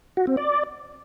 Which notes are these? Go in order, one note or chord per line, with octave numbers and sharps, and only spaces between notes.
F#4
C4
D5